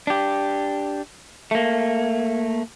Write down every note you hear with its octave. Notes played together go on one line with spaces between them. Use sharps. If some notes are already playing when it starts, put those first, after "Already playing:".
D4 G4
A3 A#3